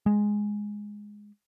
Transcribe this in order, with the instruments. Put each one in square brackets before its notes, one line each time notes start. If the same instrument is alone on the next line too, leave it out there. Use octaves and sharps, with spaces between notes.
[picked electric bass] G#3